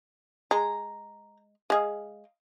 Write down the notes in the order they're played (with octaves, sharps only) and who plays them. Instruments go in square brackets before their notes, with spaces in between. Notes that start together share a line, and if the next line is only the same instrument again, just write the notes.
[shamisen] G#3 [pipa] A#5
[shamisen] G#3 G#4 [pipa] D#5 F5